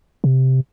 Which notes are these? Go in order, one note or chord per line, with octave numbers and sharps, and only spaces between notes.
C3